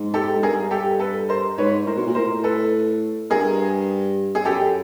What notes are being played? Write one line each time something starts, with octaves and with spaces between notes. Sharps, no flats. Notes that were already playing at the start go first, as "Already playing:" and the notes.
Already playing: G#2
G4 A4
G#2
G2 G#4 A#4
G4 A4
A4 B4
A#4 C5
G#2 B4 C#5
A2 A#4 C5
B2
A#2
A2 A#4 C5
A4 B4
G2 G#4 A#4
G#4
F#2 G4 A4